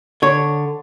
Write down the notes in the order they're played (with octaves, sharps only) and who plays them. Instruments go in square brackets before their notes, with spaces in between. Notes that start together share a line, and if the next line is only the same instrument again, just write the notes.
[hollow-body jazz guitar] D3 C#5